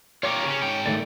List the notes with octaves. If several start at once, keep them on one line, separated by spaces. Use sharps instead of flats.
F4 G4 A#4 C#5 C#6 D6
C#3 C#4
G#2 G5
D#3 A3 D5